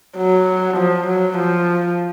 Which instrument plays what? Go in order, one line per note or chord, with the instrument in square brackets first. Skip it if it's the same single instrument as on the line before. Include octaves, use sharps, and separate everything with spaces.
[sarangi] F#3
F3
F#3
F3